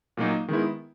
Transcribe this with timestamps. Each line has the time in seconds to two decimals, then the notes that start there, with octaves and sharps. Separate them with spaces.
0.17 A#2 F#3 A#3 D#4
0.48 D#3 G#3 B3 E4